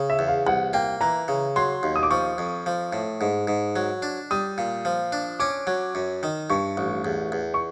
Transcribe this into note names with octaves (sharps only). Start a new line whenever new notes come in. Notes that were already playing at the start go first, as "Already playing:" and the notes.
Already playing: C#3
E5
E2
F5
C2 F#5
A#3 G5
E3 A#5
C#3
F#3 C6
D#2
D#6
D6
F3 C#6
F2
F3
A2
G#2
G#2
F#3
D4
G3 D#6
A#2
F3
D4
C#4 D6
F#3
F#2
D#3
G2 C#6
A1
E2
E2
C#6